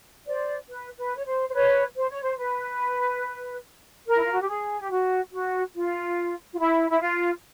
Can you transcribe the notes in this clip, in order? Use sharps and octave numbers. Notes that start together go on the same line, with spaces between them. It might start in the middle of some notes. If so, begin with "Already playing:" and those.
C5 D5
B4
B4
C#5
C5
C5
B4 C#5
C5
C#5
C5
B4
A#4
E4
F4
F#4
G4
G#4
G4
F#4
F#4
F4
F4
E4
E4
F4